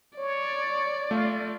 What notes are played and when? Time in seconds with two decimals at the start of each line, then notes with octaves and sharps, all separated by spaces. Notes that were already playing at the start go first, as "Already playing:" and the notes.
0.19 C#5 D5
1.11 A3 F4